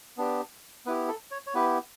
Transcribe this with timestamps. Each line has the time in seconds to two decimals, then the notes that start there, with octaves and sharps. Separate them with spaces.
0.17 B3 D4 G4
0.86 B3 E4 G4 B4
1.08 A4
1.31 C#5
1.47 C#5
1.54 B3 E4 G4 B4